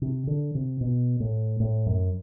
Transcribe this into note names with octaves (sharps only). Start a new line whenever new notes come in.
C3
D3
C3
B2
A2
A2
F#2